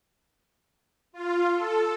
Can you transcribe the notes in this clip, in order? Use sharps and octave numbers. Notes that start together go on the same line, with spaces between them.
F4
A4